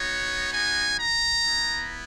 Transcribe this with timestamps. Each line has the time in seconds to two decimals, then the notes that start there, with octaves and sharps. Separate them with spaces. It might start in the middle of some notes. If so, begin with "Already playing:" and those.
Already playing: B3 D#4 F#4 C#5
0.52 G#5
0.98 A#5
1.44 B3 E4